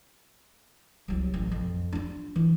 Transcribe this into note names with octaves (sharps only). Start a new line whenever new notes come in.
C2 F#3
A1
F2
D4 F4
E3